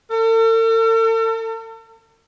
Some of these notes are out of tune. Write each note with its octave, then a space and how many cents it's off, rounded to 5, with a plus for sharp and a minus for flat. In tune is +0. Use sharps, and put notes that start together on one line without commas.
A4 +45